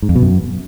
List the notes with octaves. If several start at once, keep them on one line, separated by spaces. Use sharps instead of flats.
G#2
F2
B2
F#2